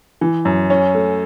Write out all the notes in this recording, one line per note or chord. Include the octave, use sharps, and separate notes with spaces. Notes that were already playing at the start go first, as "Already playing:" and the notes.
E3
F#2
C#4
A3